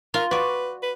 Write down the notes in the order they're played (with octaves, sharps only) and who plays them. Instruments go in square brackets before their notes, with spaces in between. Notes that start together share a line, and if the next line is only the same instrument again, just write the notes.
[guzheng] F4 [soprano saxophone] A#4
[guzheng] F#4 D5 [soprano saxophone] B4
[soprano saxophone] B4